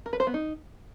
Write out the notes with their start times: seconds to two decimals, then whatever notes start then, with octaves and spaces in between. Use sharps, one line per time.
0.06 A#4
0.13 B4
0.20 C5
0.27 B3
0.34 D#4